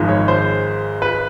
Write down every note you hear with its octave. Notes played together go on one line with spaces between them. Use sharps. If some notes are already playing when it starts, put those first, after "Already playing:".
Already playing: G#1 G#2 F3 G#3
C#5
C5
B4